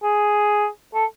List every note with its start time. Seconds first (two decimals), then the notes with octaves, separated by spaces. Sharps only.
0.03 G#4
0.95 A4